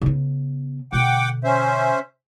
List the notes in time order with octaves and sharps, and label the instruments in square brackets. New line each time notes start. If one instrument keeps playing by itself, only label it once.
[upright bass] C#3 B3
[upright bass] B2 D3 [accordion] F#5 G5 D6
[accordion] C#4 C5 E5